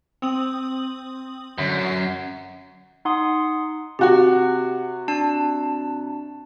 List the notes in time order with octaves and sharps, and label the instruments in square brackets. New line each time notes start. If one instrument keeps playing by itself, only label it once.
[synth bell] C4 D#6 F#7
[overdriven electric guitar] F#2 [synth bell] D3 C7
[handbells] D#4 F#5 C6 D#6
[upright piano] C3 F#4 [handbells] G4 F#5
[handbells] D4 A5